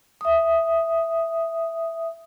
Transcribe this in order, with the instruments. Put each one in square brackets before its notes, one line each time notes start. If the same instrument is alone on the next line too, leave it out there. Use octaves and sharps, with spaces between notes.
[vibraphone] E5 D#6